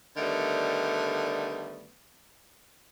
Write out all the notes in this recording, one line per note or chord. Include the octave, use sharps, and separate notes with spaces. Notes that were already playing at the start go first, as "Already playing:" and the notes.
D3 D#3 G3 A3 B3